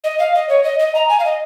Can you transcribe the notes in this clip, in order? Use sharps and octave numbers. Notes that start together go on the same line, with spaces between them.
D#5
F5
D#5
C#5
D#5
D#5
A#5
G#5
F5
D#5